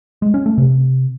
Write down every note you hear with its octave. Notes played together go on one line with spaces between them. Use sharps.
G#3
C#4
A3
C3